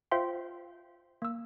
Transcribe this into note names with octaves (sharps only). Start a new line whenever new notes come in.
F4 C5 E5 F5 G5 C6
A#3 E6